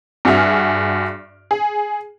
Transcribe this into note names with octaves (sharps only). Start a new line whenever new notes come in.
G2 F#4 G#4 E5 F6
G#4